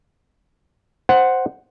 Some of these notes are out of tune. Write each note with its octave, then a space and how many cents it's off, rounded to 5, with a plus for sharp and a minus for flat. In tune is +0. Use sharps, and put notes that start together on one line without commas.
C5 +0 F#5 +0